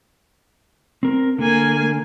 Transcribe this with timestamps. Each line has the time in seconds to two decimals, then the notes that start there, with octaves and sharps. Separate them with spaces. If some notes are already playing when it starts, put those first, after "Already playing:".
1.03 C4 A#4
1.39 D3 A#3 G#5